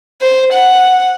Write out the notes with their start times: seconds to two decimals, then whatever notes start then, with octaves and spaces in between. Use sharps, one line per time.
0.22 C5
0.53 F#5